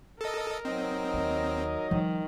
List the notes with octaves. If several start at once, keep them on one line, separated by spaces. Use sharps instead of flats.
A4 A#4 D#5
F#3 C4 D#4 D#5
D#2
D#3 F3 G3